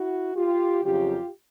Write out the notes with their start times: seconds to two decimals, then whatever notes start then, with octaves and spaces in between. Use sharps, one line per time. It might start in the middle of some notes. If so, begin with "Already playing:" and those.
Already playing: E4 F#4
0.35 F4 G4
0.83 F2 C#3 F#3 F4 G4